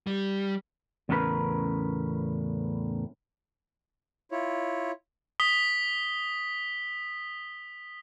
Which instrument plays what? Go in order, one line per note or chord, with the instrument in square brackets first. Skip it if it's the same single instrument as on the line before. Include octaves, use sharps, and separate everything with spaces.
[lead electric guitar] G3
[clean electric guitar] E2 A2 C#3 C#4 A#4 B4
[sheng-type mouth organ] E4 F4 C#5
[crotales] D#6 B6 G7